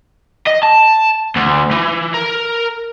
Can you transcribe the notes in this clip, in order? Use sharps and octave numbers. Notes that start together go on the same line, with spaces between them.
D#5
A5
D2
E3
A#4